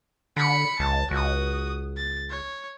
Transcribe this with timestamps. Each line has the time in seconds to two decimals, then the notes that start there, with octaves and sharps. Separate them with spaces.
0.37 D3 B5 C#7
0.80 C#2 A5
1.11 C#2 F#4 D#6
1.97 A6
2.30 C#5